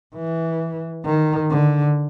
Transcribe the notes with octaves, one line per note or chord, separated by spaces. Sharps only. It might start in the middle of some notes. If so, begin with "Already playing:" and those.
E3
D#3
D3